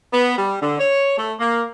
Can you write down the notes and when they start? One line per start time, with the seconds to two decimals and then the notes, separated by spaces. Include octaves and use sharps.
0.13 B3
0.37 G3
0.61 D3
0.79 C#5
1.18 A3
1.40 A#3